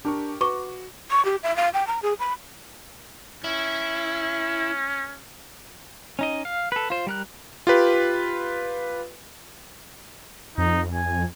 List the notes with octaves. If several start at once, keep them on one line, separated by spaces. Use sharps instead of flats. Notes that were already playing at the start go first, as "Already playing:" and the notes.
D4 G4 A#4 C#6
F#4 B4 C#6 D6
C#6
G4
E5
F5
G5
A#5
G#4
B5
C#4 E4
C#4 D#4 D#5
F5
A4 B4
F4 C5
G3 A#4 F#6
F4 G4 B4
F2 D#4
G#5